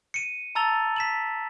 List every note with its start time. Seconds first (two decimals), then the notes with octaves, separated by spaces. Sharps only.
0.14 C#7 D#7
0.55 A5 A#5 E6 A6 F7 G7
0.96 B6 E7 F#7